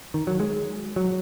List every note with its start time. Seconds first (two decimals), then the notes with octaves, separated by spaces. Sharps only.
0.14 D#3
0.27 F#3
0.40 G#3
0.96 F#3